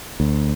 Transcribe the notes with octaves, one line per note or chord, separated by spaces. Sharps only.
D2